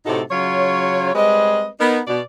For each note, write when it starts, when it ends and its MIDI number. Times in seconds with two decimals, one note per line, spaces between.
0.05 0.21 45
0.05 0.21 48
0.05 0.21 57
0.05 0.21 63
0.05 0.21 66
0.05 0.21 69
0.30 1.09 49
0.30 1.09 54
0.30 1.09 65
0.30 1.09 73
1.14 1.67 55
1.14 1.67 56
1.14 1.67 60
1.14 1.67 71
1.14 1.67 75
1.79 1.98 59
1.79 1.98 63
1.79 1.98 70
2.06 2.20 47
2.06 2.20 74